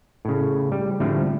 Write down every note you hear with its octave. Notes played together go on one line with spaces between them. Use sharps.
A2 C#3
G3
A2 D3 F3 G3 A3 C4